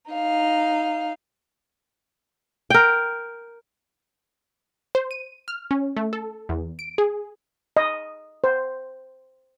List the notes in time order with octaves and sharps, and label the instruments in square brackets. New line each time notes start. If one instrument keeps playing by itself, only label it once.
[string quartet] D#4 F5
[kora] A#4 G5
[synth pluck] C5
D#7
F6
C#4
A3
A4
E2
D7
G#4
[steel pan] D#5
C5